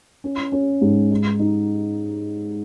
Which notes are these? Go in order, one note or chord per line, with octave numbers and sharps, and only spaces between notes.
C#4
C#4
G#2
D#4
D#4